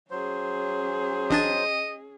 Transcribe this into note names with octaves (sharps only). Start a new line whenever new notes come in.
F#3 C#4 G#4 C5
A1 D4 D#5 A6